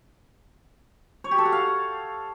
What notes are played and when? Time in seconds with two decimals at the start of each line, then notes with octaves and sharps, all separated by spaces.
1.24 C#5
1.31 G4
1.38 A4
1.45 F#5
1.52 F5